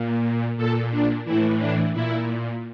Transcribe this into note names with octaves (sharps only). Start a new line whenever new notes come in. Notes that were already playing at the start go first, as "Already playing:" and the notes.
Already playing: A#2
A#2 A4
D4
A2 E3 E4
D4
A#2 E4